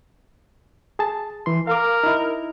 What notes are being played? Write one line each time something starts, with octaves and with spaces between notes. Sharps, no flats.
G#4 A5
E3 C6
A#4 F5 D6
D#4 E4